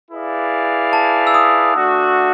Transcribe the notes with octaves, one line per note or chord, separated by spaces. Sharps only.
E4 G#4 B4 D5 F5
A5
E6
D#6
A3 D4 F#4